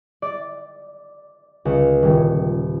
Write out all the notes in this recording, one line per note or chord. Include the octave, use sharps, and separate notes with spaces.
D5
C#2
D#1